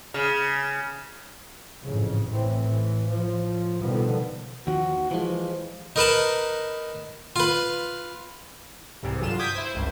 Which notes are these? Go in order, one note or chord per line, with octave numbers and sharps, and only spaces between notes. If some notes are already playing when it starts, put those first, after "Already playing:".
C#3
A1 F2 G#2 C#3
A2 E3 C4
A2 E3
A2 F3
B2 D3 D#3 F3 G3 B3
D#2 D#3 F3 F#4
E3 F3 G#3
D#4 A#4 B4 A5
F4 B4
C2 G#2 C3 E3
D2 G2 F#3 F4 E7
D6 D#6 G6 G#6 B6
E4 C5
G#1 C#2 G2